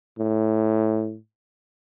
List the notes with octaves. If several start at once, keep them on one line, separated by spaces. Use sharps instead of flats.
A2